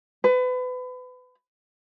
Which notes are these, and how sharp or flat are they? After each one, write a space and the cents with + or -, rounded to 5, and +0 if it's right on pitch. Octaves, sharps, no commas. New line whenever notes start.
B4 +30